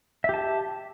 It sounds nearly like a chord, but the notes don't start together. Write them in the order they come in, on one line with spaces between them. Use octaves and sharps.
E5 G4 A5